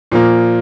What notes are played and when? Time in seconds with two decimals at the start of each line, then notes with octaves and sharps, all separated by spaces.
0.12 A#2 F3 A#3